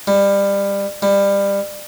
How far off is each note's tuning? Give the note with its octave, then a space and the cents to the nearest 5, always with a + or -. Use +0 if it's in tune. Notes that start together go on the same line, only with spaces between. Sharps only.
G3 +25
G3 +25